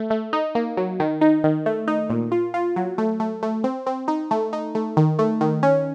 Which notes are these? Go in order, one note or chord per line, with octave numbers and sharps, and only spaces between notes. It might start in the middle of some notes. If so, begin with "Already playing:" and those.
Already playing: A3
A3
D#4
A#3
F#3
D#3
D#4
D#3
A3
D#4
A#2
F4
F4
F#3
A3
A3
A3
C4
C4
D#4
A3
D#4
A3
D#3
A3
D#3
C#4